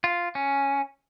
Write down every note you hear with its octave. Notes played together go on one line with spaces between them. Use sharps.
F4
C#4